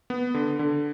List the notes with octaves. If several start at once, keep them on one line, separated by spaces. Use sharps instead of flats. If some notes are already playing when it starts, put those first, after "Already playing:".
B3
D3
D3